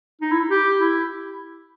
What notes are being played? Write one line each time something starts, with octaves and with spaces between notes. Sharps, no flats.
D#4
E4
G4
E4